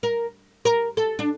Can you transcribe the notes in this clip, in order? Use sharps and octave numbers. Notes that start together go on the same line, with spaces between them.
A#4
A#4
A4
D4